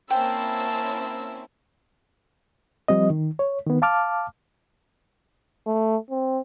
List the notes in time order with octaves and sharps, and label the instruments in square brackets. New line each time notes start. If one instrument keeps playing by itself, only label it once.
[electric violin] A#3 E6 [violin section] C4 C#4 E4 [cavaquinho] G5 [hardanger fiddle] A5
[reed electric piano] F3 G3 C4 D#5
D#3
C#5
D#3 B3
F5 A5 D6 F6
[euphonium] A3
C4